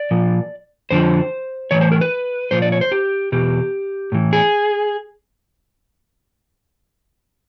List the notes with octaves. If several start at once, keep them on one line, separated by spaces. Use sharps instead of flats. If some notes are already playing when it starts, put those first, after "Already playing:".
Already playing: D5
A#2 F3
F2 D3 F3 C5
A2 E3 C#5
C5
A#4
B4
A#2 F3 C5
D5
C#5
C5
G4
E2 B2 G4
A2 E3
G#4